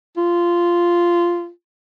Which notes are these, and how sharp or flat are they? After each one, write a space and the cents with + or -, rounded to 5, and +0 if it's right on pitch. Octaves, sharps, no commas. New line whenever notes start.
F4 -10